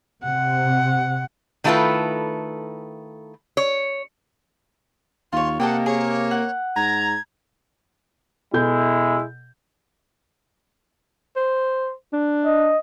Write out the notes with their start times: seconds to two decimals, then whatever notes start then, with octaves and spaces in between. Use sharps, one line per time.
0.23 C3 F#5
1.64 D#3 A3 E4 F4 A4 B4
3.57 C#5
5.32 D#2 F4 C#5 C6
5.60 C3 A#3 A4 D#5 F#5 G5
5.86 G#4 C#5
6.31 F#5
6.76 G#2 A#5 G#6
8.54 B2 G#3 E4 A4 G6
11.36 C5
12.13 D4
12.46 D#5